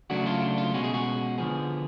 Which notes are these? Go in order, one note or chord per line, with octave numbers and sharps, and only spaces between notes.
C#3 F#3 A3 D4 F#4
F4
D4
F4
B2 G#3 C#4 F#4
G#4
F#4
D3 F3 B3 G#4